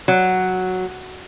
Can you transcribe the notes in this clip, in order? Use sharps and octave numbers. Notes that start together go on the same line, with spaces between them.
F#3